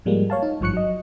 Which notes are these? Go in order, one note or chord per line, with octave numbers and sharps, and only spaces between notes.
G#2 F3 G3 G#3 A#3
C#5 F5 A5
D#4
G#1 G2 F3 C#6 F#6 C#7
F#3 D#5